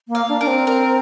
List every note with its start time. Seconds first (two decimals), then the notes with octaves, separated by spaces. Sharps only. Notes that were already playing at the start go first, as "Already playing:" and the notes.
0.08 A#3
0.15 F5
0.29 D4
0.41 D4 A#4
0.47 C4
0.67 A#4